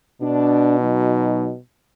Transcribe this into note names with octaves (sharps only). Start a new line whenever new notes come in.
B2 D4
F#3 D#4